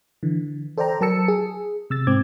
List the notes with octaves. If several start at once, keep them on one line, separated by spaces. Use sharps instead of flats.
D3 E3
A4 C5 D5 G5 A#5
F#3 A#4 A5 E6 C#7
G#4
C3 E6 A6
G#2 C4 D6 G#6